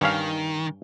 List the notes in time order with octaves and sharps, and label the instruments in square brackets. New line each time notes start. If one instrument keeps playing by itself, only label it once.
[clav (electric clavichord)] G2 C#4 F5 [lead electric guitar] D#3